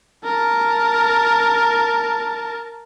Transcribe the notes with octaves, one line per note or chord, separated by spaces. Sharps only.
A#4 A5